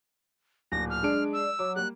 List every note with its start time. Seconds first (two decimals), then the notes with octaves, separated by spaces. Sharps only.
0.72 D1 A#2 A#6
0.90 F6
1.03 G#3 D4 G#4 D7
1.33 E6
1.59 F#3 D6
1.76 G3 A#3 F#6